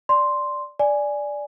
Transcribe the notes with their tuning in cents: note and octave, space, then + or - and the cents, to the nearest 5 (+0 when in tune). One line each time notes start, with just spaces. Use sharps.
D5 +0 C6 +0
D5 +0 G#5 +0